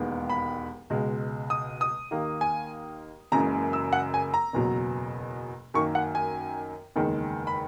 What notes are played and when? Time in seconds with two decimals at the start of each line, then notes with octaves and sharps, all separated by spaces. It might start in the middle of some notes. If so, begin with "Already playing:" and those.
Already playing: E1 D#2 D#3 G#3 B3
0.30 B5
0.90 C#2 B2 G#3
1.50 D#6
1.81 D#6
2.11 D#2 D#3 A#3
2.41 G#5
3.32 F#1 F#2 C#3 E3 G#3 A#5
3.73 E6
3.93 F#5
4.14 G#5
4.34 A#5
4.53 F#1 E2 B2 F#3
5.74 F#2 D#3 A#3 C#6
5.95 F#5
6.15 G#5
6.96 F#1 E2 D#3 G#3
7.47 B5